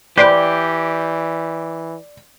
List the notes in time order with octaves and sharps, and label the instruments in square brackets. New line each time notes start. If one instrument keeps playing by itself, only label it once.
[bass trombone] E3 [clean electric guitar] G4 [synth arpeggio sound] B4 C5 G5 [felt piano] D5